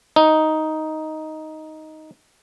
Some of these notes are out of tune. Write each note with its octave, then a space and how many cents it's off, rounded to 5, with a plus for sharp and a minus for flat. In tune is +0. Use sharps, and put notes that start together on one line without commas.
D#4 +5